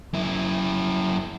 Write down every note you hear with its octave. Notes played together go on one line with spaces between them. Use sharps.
F#2 E4